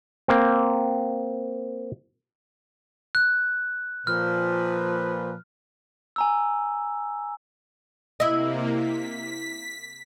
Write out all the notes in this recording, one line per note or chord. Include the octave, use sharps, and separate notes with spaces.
A#3 C4
F#6
A#2 F3 B4 F6
G#5 A#5 E6
C3 A#3 E4 D#5
B6